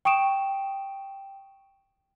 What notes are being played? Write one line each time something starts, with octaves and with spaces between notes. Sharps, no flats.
G5 C#6 D#6 D7 E7